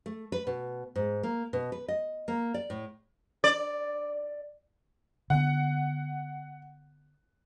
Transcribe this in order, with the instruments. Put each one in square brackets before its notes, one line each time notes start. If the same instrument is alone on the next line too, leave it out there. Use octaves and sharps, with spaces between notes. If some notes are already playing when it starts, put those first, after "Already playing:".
[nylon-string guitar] A3
B4
B2
G#2
A#3
B2
B4
D#5
A#3
D5
A2
[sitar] D5
[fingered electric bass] D3 B3 [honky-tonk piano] F#5